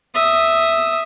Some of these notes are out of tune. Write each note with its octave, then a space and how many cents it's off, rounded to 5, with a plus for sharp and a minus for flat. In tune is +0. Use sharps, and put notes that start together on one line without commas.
E5 +0 D#6 +0